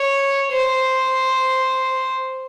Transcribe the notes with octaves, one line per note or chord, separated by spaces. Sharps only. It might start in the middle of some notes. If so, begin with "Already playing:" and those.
Already playing: C#5
C5